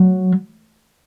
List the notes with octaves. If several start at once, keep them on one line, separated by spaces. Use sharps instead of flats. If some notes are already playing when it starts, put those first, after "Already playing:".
Already playing: F#3